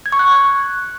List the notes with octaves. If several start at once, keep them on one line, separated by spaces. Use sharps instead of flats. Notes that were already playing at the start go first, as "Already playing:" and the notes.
G#6
C#6
F#6